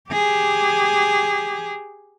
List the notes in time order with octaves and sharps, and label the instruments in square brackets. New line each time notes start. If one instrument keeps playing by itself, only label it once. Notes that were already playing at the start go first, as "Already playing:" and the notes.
[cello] G4 G#4